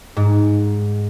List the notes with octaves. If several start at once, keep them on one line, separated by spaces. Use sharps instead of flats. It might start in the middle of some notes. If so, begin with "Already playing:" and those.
G#2